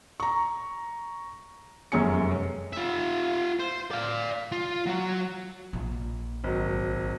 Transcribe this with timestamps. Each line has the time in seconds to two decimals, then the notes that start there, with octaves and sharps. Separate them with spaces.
0.20 A#5 C#6
1.92 F1 F#2 G#3 C#4 G#5 C#7
2.73 F4 E5
3.59 C5
3.91 D5 F5
4.52 F4
4.86 F#3 F#4
5.73 A#1
6.44 G#1 F#3